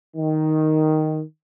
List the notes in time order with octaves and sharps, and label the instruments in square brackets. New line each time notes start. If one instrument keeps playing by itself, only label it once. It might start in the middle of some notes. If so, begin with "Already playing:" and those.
[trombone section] D#3